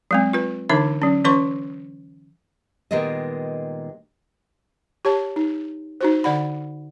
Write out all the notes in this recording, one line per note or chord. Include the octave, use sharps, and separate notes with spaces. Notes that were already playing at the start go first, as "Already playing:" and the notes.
F#3 G#3 C4
F4 B4
D3 E3 D4 D#4 E5
F#3 C#4
E3 C#4 B4 C6 C#6
A#2 D#3 G3 G#3 B3 D#5
G4 C#5 A5
D#4
D#4 F#4 C5
D3 D5 F#5 B5